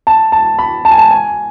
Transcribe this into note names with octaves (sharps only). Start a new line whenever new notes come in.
A5
A5
B5
A5
G#5
A5
G#5